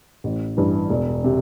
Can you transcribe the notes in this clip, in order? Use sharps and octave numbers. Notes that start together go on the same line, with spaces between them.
A1
G2 E3
E1
C3